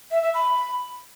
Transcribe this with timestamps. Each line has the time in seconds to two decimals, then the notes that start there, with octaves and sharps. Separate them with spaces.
0.11 E5
0.23 E5
0.34 B5